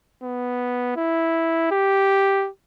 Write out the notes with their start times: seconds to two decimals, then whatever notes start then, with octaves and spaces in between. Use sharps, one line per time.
0.23 B3
0.96 E4
1.71 G4